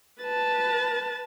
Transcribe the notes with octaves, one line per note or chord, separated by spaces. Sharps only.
B4 A5